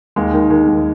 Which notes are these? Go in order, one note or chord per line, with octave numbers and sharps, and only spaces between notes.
D#2 G#3
D#3
D#3 G#3
D#2